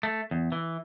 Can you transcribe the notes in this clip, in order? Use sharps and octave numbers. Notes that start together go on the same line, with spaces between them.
A3
E2
E3